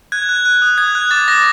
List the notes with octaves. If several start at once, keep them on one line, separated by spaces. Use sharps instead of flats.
F#6 G#6
F#6
F#6
D#6
D#6 G#6
F#6
D6 A6
D6 A#6